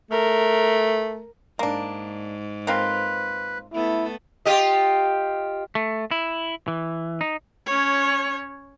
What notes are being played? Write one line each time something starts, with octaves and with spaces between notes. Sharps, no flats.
A3 A#4
G#2 A#3 D4
A#3 C4 F4 B4
A3 B3 E4 A4
F4 G4 D#5
A3
E4
E3
D#4
C#4 C#5